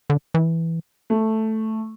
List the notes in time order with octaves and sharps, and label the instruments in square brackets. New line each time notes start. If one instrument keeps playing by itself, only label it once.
[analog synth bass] D3
E3
[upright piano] A3